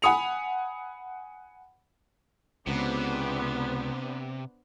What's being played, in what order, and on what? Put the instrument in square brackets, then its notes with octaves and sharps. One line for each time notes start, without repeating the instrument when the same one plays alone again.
[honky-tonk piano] F#5 G#5 B5 D#6 C#7 F7
[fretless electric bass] C#2 [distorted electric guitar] C3 [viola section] B3 D4 C5